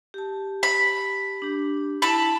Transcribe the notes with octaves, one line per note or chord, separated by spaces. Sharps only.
G4 A5
B5
D4 G4
E4 A5 B5